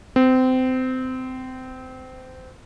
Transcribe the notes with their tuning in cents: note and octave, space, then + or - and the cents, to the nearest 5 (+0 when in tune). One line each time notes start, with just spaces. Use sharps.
C4 -25